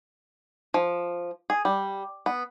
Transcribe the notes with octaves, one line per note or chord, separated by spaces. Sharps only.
F3
G#4
G3
B3